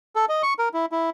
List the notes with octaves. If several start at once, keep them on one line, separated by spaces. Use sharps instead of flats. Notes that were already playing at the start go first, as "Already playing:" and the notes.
A4
D#5
C#6
A#4
E4
E4